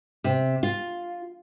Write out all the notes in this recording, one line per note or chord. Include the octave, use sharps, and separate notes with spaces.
C3
F4